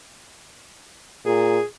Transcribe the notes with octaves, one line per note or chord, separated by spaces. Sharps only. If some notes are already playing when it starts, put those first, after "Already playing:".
A#2 G#4